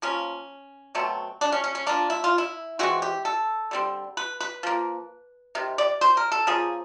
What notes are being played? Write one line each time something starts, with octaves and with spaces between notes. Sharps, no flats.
F3 A#3 C#4
B2 F#3 A3 C4
D4
C#4
C#4
C#4
F3 A#3 D4
E4
F4
E4
E3 G#3 C4 F#4
G4
A4
D3 G3 C4
B4
B4
F3 A#3
C3 D#3
D5
C5
A#4
A4
C#3 F3 A#3 G#4